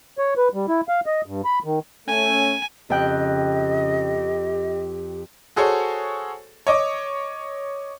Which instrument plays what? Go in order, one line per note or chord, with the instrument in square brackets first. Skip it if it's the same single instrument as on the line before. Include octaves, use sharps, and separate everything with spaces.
[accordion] C#5
B4
G3
E4
F5
D#5
G2
B5
D#3
[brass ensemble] A3 C#4 [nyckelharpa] G#5
[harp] F2 G5 F#6 [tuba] C#3 [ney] G4 [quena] D#5
[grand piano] F#4 G#4 A4 C5 C#5
C#5 D#5 D6